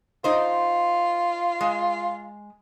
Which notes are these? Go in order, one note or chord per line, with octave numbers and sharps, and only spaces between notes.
D#4 F4 C5
G#3